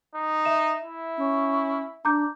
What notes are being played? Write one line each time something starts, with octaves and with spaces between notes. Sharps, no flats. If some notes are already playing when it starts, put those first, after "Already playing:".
D#4
E5 E7
E4
C#4
D4 A#5 D6 G6